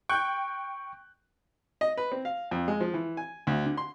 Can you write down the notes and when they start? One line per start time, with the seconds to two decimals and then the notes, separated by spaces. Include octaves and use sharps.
0.09 G5 C#6 F#6 G6
1.81 D#5
1.97 B4
2.12 C4
2.25 F5
2.51 F2
2.68 G#3
2.80 F3
2.94 E3
3.17 G#5
3.47 D2
3.66 D3
3.77 C6